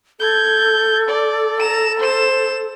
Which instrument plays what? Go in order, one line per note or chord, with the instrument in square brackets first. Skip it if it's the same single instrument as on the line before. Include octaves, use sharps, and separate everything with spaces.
[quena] A4 [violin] G6 G#6
[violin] D5
A#5 E7
C5 E7